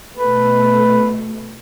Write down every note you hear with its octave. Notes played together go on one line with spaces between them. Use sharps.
B2 A3 B4